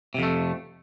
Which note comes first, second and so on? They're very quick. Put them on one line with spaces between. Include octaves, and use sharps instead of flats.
C3 F2 A3